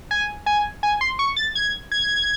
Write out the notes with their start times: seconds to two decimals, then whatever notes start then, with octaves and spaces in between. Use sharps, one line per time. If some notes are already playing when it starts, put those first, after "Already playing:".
0.11 G#5
0.46 G#5
0.83 G#5
1.01 C6
1.19 C#6
1.37 A6
1.55 G#6
1.92 G#6